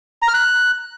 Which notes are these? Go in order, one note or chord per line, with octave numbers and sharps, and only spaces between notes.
A#5
F6
F#6